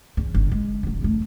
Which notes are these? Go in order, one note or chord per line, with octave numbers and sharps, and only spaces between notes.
E2
G1
G#3
D1 F#3
F2 A3